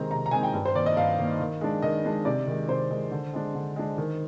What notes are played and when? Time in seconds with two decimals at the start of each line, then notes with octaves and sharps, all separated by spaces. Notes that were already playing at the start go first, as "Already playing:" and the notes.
Already playing: C3 D#3 G#3 C4 D#4 A#5
0.10 C3 A#5
0.26 A#5
0.31 D#3 G#3 C4 D#4 G#5
0.43 G5
0.54 G2
0.65 C5
0.75 D#3 A#3 D5
0.86 D#5
0.96 G2 F5
1.19 D#3 A#3
1.40 D#3
1.61 G#3 D4
1.82 D#3 D#5
2.05 G#3 D4
2.25 C3 D5
2.47 D#3 G#3
2.69 C3 C5
2.91 D#3 G#3
3.11 D3
3.34 G#3 D4
3.55 D3
3.76 G#3 D4
3.98 D#3